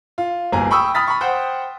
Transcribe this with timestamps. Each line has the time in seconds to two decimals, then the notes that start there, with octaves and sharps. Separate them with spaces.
0.18 F4
0.52 D1 G1 A#3 G#5 A#5
0.71 G5 B5 C#6 D#6 E6
0.95 B5 D#6 F6 A6 B6
1.07 B5 C#6
1.21 C5 F#5 G5